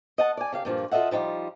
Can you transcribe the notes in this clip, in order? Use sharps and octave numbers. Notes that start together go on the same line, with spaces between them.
D#5 F#5 A5
D5 G#5
C#3 G4 F5
G2 A#2 F3 F4
F4 A4 D#5 E5 F#5
F3 G3 D4 D#4 F4